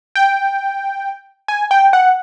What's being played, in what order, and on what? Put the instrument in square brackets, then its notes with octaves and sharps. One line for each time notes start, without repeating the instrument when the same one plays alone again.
[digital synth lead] G5
G#5
G5
F#5